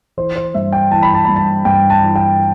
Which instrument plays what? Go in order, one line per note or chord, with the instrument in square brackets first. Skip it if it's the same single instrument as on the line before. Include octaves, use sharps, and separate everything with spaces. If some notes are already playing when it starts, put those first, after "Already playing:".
[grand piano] E3 C5
C5
G2 E5
G5
E3 A5
B5
A5
G2 B5
A5
G2 G5
A5
E3
G5